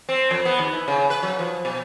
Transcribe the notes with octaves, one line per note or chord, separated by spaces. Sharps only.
C4
F2
B3
D#2
E4
C#3
B4
F#3
F3
B2